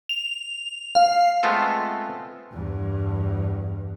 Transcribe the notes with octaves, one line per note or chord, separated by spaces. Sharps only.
F7
F5
G#3 A3 B3 C4 F4 A4
E2 G2